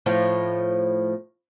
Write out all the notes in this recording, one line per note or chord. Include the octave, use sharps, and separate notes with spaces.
A2 F3